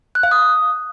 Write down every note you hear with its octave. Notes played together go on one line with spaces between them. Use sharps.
F#6
F5
D#6